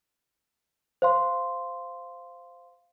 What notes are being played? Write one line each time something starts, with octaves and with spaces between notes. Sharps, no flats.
C5 F5 C6